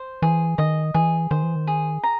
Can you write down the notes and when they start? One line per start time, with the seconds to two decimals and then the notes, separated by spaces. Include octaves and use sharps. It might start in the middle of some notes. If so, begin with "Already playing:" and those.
Already playing: C5
0.22 E3 G#4
0.58 D#3 D#5
0.94 E3 G#4
1.31 D#3 C5
1.43 E3
1.56 D#3
1.67 G#4
2.03 A#5